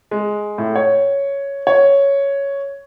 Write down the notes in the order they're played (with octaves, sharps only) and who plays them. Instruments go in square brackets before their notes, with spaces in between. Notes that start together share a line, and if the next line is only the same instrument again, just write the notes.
[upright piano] G#3
A2
C#5
C#5